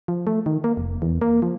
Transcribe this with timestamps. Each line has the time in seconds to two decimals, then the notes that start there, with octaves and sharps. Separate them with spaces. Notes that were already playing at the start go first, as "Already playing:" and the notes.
0.08 F3
0.27 A3
0.46 D#3
0.64 A#3
0.77 F1
1.02 E2
1.22 A#3
1.42 F3